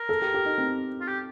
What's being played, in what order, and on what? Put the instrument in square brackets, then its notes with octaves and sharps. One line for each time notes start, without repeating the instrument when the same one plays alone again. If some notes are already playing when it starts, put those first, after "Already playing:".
Already playing: [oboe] A#4
[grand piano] A4
G4
G4
D#4
C4
[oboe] F4
G4